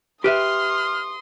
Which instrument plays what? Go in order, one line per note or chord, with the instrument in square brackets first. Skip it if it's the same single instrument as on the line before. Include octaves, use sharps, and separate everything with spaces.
[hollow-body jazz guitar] G4 B4 E5 [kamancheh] C6 D#6 [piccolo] F6